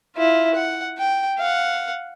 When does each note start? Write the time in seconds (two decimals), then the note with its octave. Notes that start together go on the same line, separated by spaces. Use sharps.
0.16 E4 F4
0.54 F#5
0.98 G5
1.38 F5 F#5